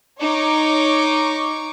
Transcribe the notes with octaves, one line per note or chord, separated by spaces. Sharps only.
D#4 C#5 C#6 D6